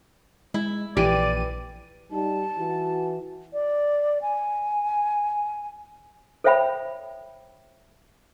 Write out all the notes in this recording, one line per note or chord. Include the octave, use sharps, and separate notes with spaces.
G#3 E4
A#1 E3 G4 D5 D#7
G3 D#4 A5
E3 F#4
D5
G#5
A4 C5 C#5 E5 G5 B5